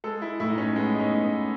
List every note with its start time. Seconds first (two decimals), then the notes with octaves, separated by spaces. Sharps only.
0.04 G#3 A4
0.22 E4
0.40 A2 E4
0.50 D#4
0.57 C#4
0.76 G#3 B3
0.95 D#4
0.99 C#4
1.11 A2
1.23 B3